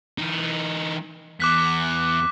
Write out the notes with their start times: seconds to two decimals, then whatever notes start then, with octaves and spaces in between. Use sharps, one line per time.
0.18 E3 D#4
1.40 E2 D6 F#6 B6